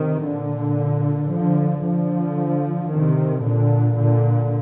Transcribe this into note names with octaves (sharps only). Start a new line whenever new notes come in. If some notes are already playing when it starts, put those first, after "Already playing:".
Already playing: C3 D#3
A#2 D3
D3 F3
D3 F3
C3 D#3
A#2 D3
A#2 D3